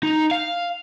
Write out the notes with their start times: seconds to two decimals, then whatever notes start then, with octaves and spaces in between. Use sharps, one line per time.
0.03 D#4
0.31 F5